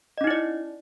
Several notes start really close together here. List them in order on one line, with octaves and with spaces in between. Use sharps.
D#5 C#4 D#4 E4 D5